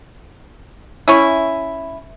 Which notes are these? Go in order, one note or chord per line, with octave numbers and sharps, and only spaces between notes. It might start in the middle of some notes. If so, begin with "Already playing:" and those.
C#4 E4